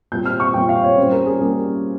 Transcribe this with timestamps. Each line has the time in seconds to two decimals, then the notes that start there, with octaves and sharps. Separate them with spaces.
0.12 A#2 G3 C4 G6
0.26 F6
0.40 C#6
0.54 A#2 G3 C4 G5
0.69 F5
0.84 C#5
0.98 G3 A#3 C#4 C5
1.12 A#4
1.26 G#4
1.41 G3 A#3 C#4